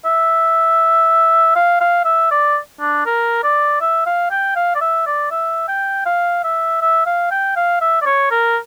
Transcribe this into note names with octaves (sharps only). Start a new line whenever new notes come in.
E5
F5
F5
E5
D5
D4
A#4
D5
E5
F5
G5
F5
D5
E5
D5
E5
G5
F5
E5
E5
F5
G5
F5
E5
D5
C#5
A#4